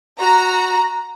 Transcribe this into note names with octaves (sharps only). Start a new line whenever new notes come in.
F#4 A#5